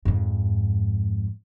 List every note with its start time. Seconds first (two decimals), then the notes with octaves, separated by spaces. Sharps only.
0.05 F2 G#2